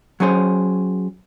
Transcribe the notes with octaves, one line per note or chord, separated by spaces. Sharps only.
F#3 C#4 G#4 C5